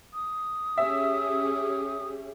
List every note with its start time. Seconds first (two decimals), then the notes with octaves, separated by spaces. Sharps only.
0.13 D#6
0.78 C#4 G4 G#4 E5